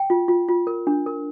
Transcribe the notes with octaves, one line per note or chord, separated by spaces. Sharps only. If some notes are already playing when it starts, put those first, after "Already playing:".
Already playing: G5
F4
F4
F4
A#4
D4
A#4